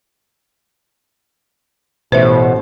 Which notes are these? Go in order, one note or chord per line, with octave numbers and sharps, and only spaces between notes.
A1 B2 B4 C5 E5